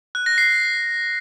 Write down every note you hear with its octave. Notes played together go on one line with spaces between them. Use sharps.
F#6
A#6
C7